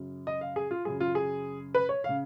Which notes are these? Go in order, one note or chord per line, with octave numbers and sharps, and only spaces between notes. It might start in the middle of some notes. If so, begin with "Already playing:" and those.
Already playing: F#2 C#3
D#5
F5
G#4
F4
F#2 C#3 G#4
F4
G#4
B4
C#5
C#3 F5